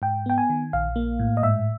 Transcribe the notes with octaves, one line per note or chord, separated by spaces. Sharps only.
G#2 G5
B3 G5
G#5
D#3
A#1 F5
A#3
A2
D#5
G#2 E5